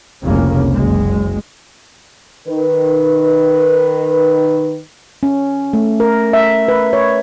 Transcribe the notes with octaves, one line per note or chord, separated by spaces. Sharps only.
F1 C2 C#3 A#3 C#4
F#1 G#3
D#3 B4
C#4
A3
A#4
E5
B4
C#5